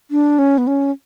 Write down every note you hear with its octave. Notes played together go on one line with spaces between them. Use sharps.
D4
C#4
B3
C#4